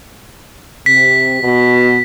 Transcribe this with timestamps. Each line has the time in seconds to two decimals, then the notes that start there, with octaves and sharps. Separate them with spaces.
0.86 C3 B6
1.41 B2